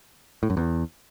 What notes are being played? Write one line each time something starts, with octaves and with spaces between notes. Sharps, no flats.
A2
F#2
E2